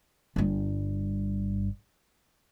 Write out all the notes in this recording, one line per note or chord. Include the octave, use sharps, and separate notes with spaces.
G1 G2